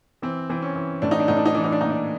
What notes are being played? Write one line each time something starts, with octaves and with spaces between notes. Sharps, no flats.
E3 C4
E3 C4
C#4
E3
A2 D4
D#4
D4
A2 D#4
D4
D#4
E3 D4
D#4
D4
A#2 D#4
D4